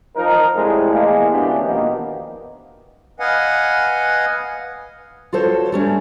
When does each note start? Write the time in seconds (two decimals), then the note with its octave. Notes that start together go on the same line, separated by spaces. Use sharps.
0.16 F3 D#4 A#4
0.56 A2 C3 G3 G#3
0.93 E2 G#3 A#3
1.30 D2 E3 B3 C#4 D4 G4
1.66 B2 D#3 F3 A#3 B3
3.20 B4 D#5 F5 F#5 G#5
5.33 F4 F#4 A4 C5 C#5
5.72 G3 A3 C#4